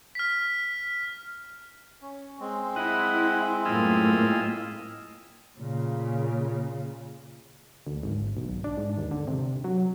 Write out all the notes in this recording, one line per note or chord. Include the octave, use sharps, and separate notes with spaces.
F6 B6
C#4
G#3 C4
E4 D#5 F#5
F#2 A2 A#3 E4 F4 D#5
A#2 C#3
D2
G#1
B1
D4
G#2
D#2
D3
C3
F#3